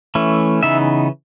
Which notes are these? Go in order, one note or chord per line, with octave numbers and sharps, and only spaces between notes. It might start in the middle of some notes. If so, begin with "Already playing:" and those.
E3 A3 C#4
C#3 E3 B3 D#4 E5